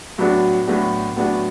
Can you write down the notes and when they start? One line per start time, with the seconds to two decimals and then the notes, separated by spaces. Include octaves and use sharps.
0.18 A2 F#3 B3 D4 F#4
0.67 A2 F#3 B3 D4 F#4
1.16 A2 F#3 B3 D4 F#4